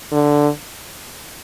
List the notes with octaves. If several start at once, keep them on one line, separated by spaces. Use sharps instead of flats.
D3